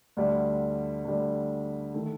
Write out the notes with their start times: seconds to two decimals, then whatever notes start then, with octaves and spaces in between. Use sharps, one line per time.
0.17 D2 D3 G3
1.05 D2 D3 G3
1.94 D#3 A3